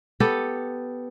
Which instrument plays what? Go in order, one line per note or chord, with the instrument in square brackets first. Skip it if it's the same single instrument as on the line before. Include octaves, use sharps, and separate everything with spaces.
[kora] B3 G4 A4